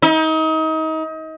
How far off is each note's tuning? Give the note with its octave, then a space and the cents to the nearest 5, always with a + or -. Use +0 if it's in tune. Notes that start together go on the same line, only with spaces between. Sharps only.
D#4 +30